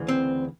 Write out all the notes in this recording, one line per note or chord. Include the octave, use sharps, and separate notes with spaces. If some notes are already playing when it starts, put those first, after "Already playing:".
Already playing: D2 C#3 E3
C4